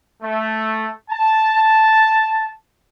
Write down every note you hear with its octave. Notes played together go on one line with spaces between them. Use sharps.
A3
A5